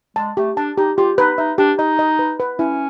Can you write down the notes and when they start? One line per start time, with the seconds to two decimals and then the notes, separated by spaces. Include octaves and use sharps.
0.16 G#3 A5
0.37 A3 G4
0.57 D4 A5
0.78 D#4 G4
0.97 F4 G4
1.18 D#4 B4
1.38 D#4 E5
1.58 D4 G4
1.79 D#4 D#5
1.99 D#5
2.19 B4
2.40 B4
2.59 C#4 E4